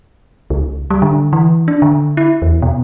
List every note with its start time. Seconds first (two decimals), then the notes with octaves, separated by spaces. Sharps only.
0.50 C#2
0.90 G3
1.02 D3
1.33 E3
1.68 D4
1.82 D3
2.17 E4
2.42 E2
2.62 B2